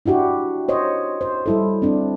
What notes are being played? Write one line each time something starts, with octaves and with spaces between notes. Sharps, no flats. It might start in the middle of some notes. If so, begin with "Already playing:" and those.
D4 E4 F#4 G4
C5 C#5 D#5
C5
G3 E4 A4
C4 D4